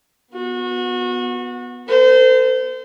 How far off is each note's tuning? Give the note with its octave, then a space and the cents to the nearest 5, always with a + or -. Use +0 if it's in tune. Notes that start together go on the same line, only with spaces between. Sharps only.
B3 +0 F#4 -30
A4 +45 C5 -30